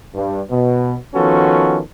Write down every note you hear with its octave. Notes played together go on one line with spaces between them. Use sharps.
G2
B2
D#3 F3 B3 C#4 F#4 A4